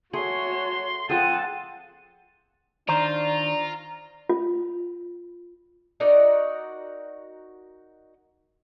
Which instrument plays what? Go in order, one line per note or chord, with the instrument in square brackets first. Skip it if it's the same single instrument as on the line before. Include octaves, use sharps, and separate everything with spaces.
[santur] A3 [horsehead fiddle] F#4 C#5 [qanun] G#4 [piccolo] C6
[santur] F3 C4 A4 [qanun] F4 G#4 [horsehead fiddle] F#5 A5 [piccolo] D#7
[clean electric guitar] D#3 C5 [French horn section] D4 D5 [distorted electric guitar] F4 [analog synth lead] A#5
[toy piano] F4
[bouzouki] D#4 F#4 A#4 D5